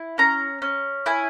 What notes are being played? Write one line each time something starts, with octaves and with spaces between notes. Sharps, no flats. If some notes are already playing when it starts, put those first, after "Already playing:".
Already playing: E4
C#4 A#5
C#4
E4 G#5